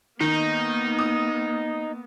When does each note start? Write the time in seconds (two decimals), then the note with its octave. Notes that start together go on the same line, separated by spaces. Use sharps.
0.21 D#3 A#3 B3 D#4
0.99 D#6